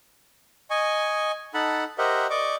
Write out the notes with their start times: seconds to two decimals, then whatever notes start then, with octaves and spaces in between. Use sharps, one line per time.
0.70 D#5 G#5 C#6
1.54 D#4 A4 F#5 A5 B5
1.98 G4 A#4 C5 D#5 E5 F#5
2.30 D5 D#5 C#6 D6